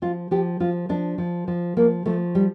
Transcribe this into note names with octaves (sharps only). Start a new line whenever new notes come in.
F3 F4
F3 G4
F3 F4
F3 D4
F3
F3
F3 A#3
F3 A3
G3